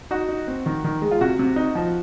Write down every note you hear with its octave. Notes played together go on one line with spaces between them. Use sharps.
D#4 F#4
D#4
C4
D#3
D#3
G#3
F4
C3 F#4
C3
D#4
F3